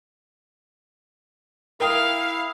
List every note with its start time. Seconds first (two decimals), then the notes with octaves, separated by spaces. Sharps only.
1.80 E4 A#4 F5 G5 D#6